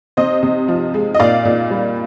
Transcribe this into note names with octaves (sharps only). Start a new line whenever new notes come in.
C3 C5 D#5
C3
F3
G#3
D#5
A#2 D5 F5
A#2
G3